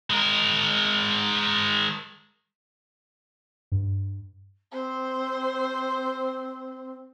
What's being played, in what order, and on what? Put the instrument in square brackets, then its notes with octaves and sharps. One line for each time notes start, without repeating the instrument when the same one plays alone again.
[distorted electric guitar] G#3 A#4
[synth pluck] G2
[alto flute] C4 [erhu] C5